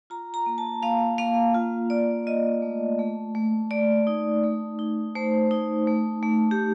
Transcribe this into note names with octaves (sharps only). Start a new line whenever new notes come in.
F4 A#5
A#5
A#3
A5
A#3 F5
A#3 F5
F4
F4 D5
F4 D#5
A3
A3
A3
A3 D5
D#4
A3
D#4
A3 C5
D#4
A3
A3
G4